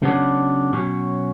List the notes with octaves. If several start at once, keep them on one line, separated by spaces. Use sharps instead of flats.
C#3 F#3 B3 D4
B2 F#3 C#4